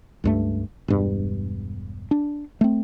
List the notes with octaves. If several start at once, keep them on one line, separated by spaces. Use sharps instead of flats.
C#2 G2 A3
E1 G2
D4
A3 C4